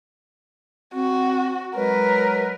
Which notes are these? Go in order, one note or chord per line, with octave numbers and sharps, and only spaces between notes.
C4 F#4
F#3 G#3 A#4 B4